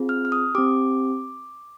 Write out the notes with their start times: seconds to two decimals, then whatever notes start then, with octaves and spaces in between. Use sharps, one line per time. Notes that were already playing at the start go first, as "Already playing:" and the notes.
Already playing: C4 F4 G#4
0.09 F6
0.25 F6
0.32 D#6
0.55 C4 G4 D6